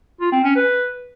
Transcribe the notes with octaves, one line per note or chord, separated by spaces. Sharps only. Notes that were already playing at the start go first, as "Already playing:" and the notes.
F4
C4
C#4
B4